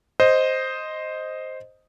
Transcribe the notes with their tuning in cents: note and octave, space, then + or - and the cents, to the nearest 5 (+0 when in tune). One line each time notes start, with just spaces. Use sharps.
C5 +0 D#5 +0